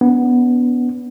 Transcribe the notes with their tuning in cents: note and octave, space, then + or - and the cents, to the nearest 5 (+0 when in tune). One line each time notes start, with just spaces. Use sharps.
B3 +0 D4 -40